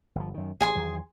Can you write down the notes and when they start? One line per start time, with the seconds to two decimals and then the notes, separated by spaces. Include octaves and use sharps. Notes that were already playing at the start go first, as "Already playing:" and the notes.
0.15 G1 F3
0.34 F#2 D#3
0.61 A1 G#4 G#5 C6
0.75 E2 D#3 F#3